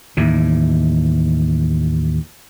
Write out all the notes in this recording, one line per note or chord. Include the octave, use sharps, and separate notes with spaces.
D#2 A2 E3